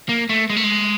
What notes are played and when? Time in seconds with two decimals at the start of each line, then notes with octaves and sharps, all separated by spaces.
0.09 A#3
0.29 A3
0.50 G#3
0.57 A3
0.63 G#3